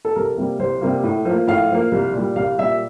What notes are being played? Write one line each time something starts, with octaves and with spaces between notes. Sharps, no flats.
A4
C2 A#4
C3 G3 A#3
C2 C5
C3 G3 A#3
A2
F3 A#3
A2 F5
F3 A#3
C2
A#2
G3
C2 F5
A#2 G3 E5